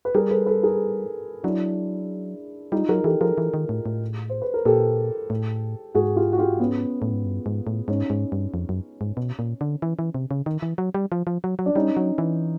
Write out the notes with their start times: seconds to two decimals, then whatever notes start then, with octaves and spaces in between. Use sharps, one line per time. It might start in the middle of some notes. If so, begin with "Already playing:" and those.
0.05 B4
0.15 G3 G#4 A#4
0.31 A4 B4
0.46 A4 B4
0.63 G#4 A#4
1.43 F#3 D4 E4
2.72 G3 D#4 F4
2.89 F#3 G#4 A#4
3.04 E3 G4 A4
3.21 F3 G#4 A#4
3.38 E3
3.54 D#3
3.69 A2
3.86 A2
4.30 C5
4.42 B4
4.54 A#4
4.66 A#2 G4 A4
5.30 A2
5.95 G#2 F#4 G#4
6.16 F4 G4
6.33 F#4
6.38 F4 G4
6.60 B3 C#4
7.02 A2
7.12 G#2
7.25 G2
7.46 G#2
7.67 A2
7.88 G#2 C#4 D#4
8.10 G#2
8.32 G2
8.54 F2
8.69 F#2
9.01 G#2
9.17 B2
9.39 A#2
9.61 D3
9.82 E3
9.99 E3
10.15 C3
10.31 C#3
10.46 D#3
10.62 E3
10.78 F#3
10.94 G3
11.12 F3
11.27 F3
11.44 F#3
11.59 F#3
11.66 D4
11.75 G3 C#4 D#4
11.97 F#3
12.18 E3